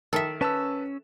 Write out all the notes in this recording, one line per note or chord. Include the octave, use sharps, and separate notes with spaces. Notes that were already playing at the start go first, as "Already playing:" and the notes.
D#3 A4 E5
C#4 B4 A5 E6 E7